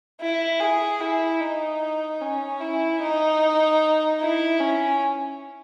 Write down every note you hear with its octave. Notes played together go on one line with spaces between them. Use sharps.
E4
G#4
E4
D#4
C#4
E4
D#4
E4
C#4